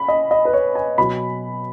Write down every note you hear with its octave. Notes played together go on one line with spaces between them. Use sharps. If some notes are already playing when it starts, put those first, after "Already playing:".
Already playing: B5
D#5
D#5
B4
C#5
G#5
B2 F#3 B5